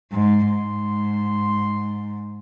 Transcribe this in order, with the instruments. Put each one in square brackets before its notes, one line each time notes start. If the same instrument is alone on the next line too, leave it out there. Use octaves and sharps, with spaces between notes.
[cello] G#2 [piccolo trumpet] C6
[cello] G#2